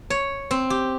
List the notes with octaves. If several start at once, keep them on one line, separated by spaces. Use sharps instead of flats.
C#5
C4
G4